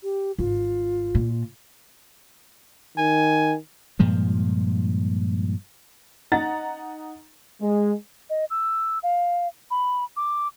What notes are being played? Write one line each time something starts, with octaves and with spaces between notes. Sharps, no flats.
G4
G#1 F4
A#2
D#3 G#5
G2 A#2 F3 G#3
D#4 F#5 A#5 A6
G#3
D#5
E6
F5
B5
D6